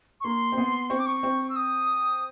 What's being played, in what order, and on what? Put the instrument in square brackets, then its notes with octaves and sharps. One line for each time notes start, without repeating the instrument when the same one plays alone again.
[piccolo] C#6
[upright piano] A#3 [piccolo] C6
[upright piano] C4
B3
[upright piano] C4 [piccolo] C#6
[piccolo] D6
C#6
[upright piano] C4
[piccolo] E6
D#6